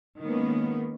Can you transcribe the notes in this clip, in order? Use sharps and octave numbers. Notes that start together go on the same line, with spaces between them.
D#3 G#3 A#3 B3 C#4